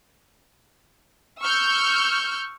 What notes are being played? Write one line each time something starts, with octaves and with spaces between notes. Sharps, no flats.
C#6 E6 F6 G6